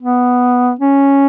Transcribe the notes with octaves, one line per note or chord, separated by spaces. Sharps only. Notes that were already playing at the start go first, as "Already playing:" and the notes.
B3
C#4